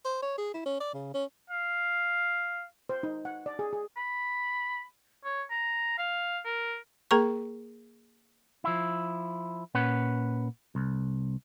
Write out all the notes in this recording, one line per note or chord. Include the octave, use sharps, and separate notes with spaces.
C5
C#5
G#4
E4
C#4
D5
C#3
C#4
F5
C5
D#4
F#5
D5
G#4
G#4
B5
C#5
A#5
F5
A#4
A#3 G#4 A#4 A#5 C#6
F3 E4
A#2 C#4 B4 F#5
C2